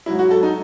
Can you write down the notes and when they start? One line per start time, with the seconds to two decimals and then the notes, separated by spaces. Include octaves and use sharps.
0.06 G#2 F#3 E4
0.19 F#4
0.31 A4
0.43 D#4